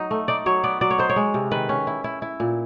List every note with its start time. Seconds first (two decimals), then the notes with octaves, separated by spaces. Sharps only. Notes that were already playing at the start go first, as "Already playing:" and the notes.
Already playing: F#3 D#4
0.11 A3
0.28 D#4 D5
0.46 F#3 C#5
0.64 B3 D5
0.81 F#3 D5
0.91 C#5
0.98 D#4 C5
1.09 C#5
1.16 G#3
1.34 C3
1.51 D#3 B4
1.69 C#4
1.87 E4
2.04 E4
2.22 E4
2.40 A#2